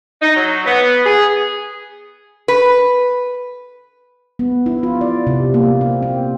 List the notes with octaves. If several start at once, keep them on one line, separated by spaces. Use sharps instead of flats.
D#4
F#3
B3
G#4
B4
B3
E4
F4
D5
C3
A#3
C4
C4